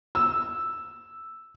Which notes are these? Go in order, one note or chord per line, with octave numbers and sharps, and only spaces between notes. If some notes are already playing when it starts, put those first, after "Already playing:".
E6